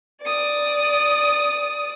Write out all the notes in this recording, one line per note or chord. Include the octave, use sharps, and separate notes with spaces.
D5 D#6